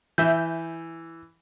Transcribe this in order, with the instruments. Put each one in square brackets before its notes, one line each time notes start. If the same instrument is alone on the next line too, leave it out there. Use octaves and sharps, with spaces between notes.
[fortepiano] E3 [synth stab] E5 G6